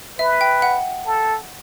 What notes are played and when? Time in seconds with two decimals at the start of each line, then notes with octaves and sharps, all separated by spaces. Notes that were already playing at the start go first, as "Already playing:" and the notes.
0.19 B4 E5
0.41 G5
0.62 F#5
1.06 A4